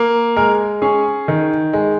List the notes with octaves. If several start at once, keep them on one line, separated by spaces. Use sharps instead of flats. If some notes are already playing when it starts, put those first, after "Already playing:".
Already playing: A#3
G#3 A#4
C#4 G#4
D#3
G#3